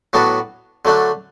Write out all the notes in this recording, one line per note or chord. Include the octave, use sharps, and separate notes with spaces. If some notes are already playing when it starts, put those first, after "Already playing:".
A2 F#3 B3 D4 F#4
D3 F#3 A3 D4